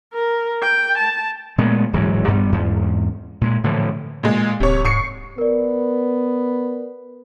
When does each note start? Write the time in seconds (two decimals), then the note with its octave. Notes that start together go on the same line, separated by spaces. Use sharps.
0.14 A#4
0.62 G5
0.98 A5
1.58 A#2 G#3 A3 B3
1.93 D1 G#2 E3 F#3
2.28 G2 G3 B3
2.52 E2 G#2
3.41 A#2 G#3
3.64 A2 D3 E3 F3
4.23 A#2 G#3
4.60 D1 C3 C#5
4.85 G#2 C#6 C7 C#7
5.38 B3 A#4 D5